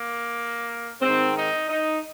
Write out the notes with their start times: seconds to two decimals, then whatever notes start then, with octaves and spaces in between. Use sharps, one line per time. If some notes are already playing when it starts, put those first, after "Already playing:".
Already playing: A#3
1.02 G#2 C4
1.07 D#3
1.36 D#4
1.68 D#4